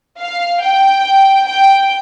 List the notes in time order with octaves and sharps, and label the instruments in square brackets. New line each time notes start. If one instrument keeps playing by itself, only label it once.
[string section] F5
G5
G5